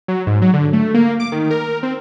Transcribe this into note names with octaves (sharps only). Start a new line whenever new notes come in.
F#3
G#2
F#3
D3
A3
A#3
D6
D#3
A#4
C4